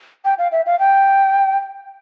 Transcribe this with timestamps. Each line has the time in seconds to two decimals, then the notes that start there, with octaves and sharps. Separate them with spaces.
0.25 G5
0.38 F5
0.52 E5
0.66 F5
0.79 G5